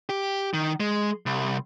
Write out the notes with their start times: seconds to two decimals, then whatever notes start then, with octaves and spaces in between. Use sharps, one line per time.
0.09 G4
0.54 D#3
0.80 G#3
1.26 C2